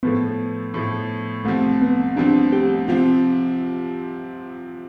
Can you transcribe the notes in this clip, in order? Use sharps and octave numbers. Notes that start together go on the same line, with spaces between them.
A2 F3 A3 B3
A2 F3 A3
C2 C3 F3 A3 C4
B3
C2 C3 F3 C4 D4
G4
C3 F3 C4 F4